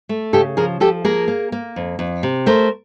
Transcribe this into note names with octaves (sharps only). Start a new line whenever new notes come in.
A3
C#3 G4 A4
F3 G#4 A#4
F3 G4 A4
A#3 G#4 A#4
A#3
A#3
F2
F2
C3
A3 A#4 C5